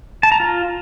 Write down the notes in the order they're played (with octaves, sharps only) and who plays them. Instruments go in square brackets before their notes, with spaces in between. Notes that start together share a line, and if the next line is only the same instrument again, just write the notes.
[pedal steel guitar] A5
A#5
F4